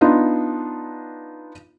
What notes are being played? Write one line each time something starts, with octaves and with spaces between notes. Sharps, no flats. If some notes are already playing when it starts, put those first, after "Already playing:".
B3 D4 D#4 F4